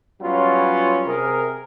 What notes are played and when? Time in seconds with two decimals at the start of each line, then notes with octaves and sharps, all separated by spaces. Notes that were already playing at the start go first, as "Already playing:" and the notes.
0.21 F#3 G3 B3 C#4 F4
1.06 C3 G#4 A#4